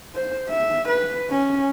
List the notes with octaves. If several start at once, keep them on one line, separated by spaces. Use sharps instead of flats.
C5
E5
B4
C#4